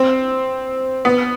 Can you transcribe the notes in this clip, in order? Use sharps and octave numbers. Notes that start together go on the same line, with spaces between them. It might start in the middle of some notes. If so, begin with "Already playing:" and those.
Already playing: C4
B3